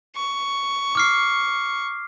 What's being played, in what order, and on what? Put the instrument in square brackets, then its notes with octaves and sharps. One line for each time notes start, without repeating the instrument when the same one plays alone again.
[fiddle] C#6
[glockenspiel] D6 F6 C7